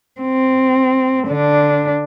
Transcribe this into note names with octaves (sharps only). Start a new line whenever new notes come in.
C4
D3 D4